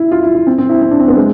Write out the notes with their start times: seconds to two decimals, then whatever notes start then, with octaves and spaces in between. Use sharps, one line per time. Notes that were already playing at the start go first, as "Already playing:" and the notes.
Already playing: E4
0.11 F4
0.23 E4
0.35 E4
0.47 C4
0.58 C4
0.69 E4
0.81 C4
0.91 D4
1.00 C4
1.08 B3
1.17 G#3